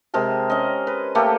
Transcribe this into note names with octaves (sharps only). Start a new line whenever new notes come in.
C3 G#3 A#4 A5
C#4 D#5
B4
A3 A#3 G4 A4